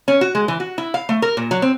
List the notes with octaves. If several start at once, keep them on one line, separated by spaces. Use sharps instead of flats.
C#4
F#4
G#3
E3
F#4
E4
F5
A3
A#4
A#2
F#3
C4